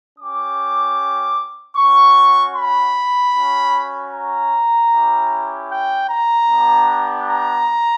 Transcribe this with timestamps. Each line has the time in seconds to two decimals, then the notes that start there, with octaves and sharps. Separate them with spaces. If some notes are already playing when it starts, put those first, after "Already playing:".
0.19 C#4 G4 D6
1.76 C#4 F#4 C#6
2.56 B5
3.34 C#4 F#4
4.12 A#5
4.91 C#4 E4 G4
5.69 G5
6.09 A#5
6.48 B3 D4 G4
7.27 A#5